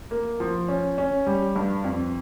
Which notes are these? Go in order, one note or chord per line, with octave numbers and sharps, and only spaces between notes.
A#3
F3
C#4
C#4
G3
G2
F2